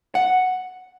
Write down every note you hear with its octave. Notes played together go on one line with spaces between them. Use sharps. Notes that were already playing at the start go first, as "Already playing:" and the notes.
F#5